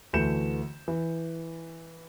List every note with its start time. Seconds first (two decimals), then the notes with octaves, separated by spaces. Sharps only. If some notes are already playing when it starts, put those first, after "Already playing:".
0.13 D2 E3 A3 G6 C#7 E7
0.88 E3